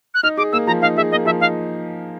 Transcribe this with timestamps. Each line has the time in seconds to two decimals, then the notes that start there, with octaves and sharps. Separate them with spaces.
0.14 F#6
0.23 D#4 F6
0.37 G#4 D6
0.52 A#3 E6
0.67 F3 A#5
0.81 D#4 F5
0.97 G#4 E5
1.11 A#3 D#5
1.25 F3 E5
1.40 D#4 F5